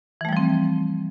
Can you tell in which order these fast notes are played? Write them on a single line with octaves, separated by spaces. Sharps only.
E3 A3 G3 F3 C4